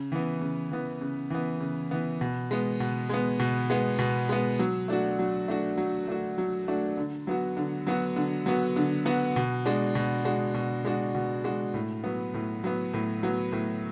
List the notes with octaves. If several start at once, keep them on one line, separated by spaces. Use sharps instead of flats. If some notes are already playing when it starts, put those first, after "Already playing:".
Already playing: C#3
E3 B3
C#3
E3 B3
C#3
E3 B3
C#3
E3 B3
B2
G#3 B3
B2
G#3 B3
B2
G#3 B3
B2
G#3 B3
F#3
A3 D4 F#4
F#3
A3 D4 F#4
F#3
A3 D4 F#4
F#3
A3 D4 F#4
D3
F#3 B3 F#4
D3
F#3 B3 F#4
D3
F#3 B3 F#4
D3
F#3 B3 F#4
B2
G#3 D4 F#4
B2
G#3 D4 F#4
B2
G#3 D4 F#4
B2
G#3 D4 F#4
A2
F#3 B3
A2
F#3 B3
A2
F#3 B3
A2